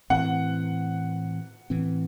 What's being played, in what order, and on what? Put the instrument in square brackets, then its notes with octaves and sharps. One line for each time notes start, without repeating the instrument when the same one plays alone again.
[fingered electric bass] A2 E3 C4 [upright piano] F#5
[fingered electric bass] A2 E3 C4